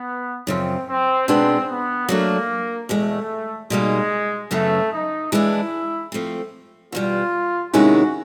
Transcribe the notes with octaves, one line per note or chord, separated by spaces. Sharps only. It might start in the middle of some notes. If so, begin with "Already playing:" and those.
Already playing: B3
F#2 C#3 F3 C4
C4
B2 G#3 B3 C4 D4
B3
F#3 A3 A#3 D4
E2 B2 G#3 A3
B2 G3 G#3 A#3 D#4
F#2 C#3 F#3 A3 B3
D#4
E3 G#3 B3 D4 E4
F3 A3 C4
E2 B2 G3 F4
C3 D#3 G#3 C#4 E4 F#4